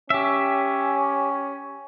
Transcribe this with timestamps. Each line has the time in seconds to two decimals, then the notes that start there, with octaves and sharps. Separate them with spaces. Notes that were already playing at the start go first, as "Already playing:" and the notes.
0.10 C#4 G4 E5